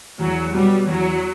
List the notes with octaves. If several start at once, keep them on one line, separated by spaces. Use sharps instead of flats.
E2 F#3
B2 F#3 G3 B3
E2 F#3